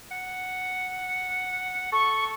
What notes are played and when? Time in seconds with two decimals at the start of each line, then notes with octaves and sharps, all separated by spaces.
0.11 F#5
1.92 A4 C#6